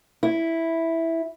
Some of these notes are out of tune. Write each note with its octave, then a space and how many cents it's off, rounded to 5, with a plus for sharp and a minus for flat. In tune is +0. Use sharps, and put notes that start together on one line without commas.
E4 -5